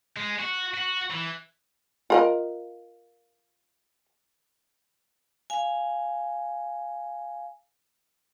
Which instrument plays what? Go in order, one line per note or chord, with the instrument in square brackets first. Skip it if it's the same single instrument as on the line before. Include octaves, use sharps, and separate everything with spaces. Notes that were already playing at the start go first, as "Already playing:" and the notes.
[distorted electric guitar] G#3
F#4
F#4
E3
[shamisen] F4 A#4 D#5
[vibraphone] F5 G#5